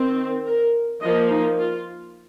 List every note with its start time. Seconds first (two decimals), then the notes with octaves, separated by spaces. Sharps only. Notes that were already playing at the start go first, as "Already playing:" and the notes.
Already playing: D#3 C4
0.45 A#4
1.02 F3 A#3 D#5
1.30 D#4
1.58 F4